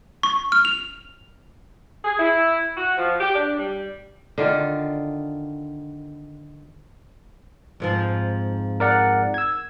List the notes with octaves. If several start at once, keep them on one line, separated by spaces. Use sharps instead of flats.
C#6
F6
F7
G#4
E4
F#4
F3
G4
D4
G3
D3 D#3 F4
F2 G#2 F3
A#4 D5 F#5
E6 G#6